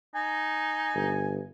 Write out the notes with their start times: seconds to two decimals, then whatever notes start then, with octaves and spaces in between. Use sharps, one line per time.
0.15 D#4 G#5
0.95 G1